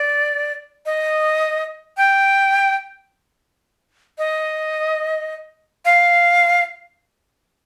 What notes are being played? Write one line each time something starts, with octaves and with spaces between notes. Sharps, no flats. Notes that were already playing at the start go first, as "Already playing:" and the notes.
Already playing: D5
D#5
G5
D#5
F5